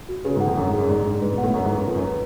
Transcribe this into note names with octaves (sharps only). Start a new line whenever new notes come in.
F#4
C#3 B4
G#2
F#5
F2
F#2 D4
G#2
G#4
F#2
G#2 D5
G#2 D4
G#2 B4
B2
F#5
A2
F#2 C#6
G#2
B4
F#2
F2 F4
F#2
B4